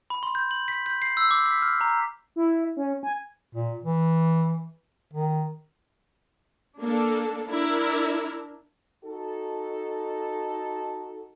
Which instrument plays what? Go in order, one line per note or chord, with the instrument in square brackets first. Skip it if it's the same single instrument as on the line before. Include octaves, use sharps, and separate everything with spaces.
[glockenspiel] B5
C6
G6
F#7
B6
G6
C7
E6
D6
B6
F6
A#5
[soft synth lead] E4
C#4
G#5
[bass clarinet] A#2
E3
D#3
[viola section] A#3 D4 A4
D4 E4 A#4
[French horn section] D#4 F#4 A4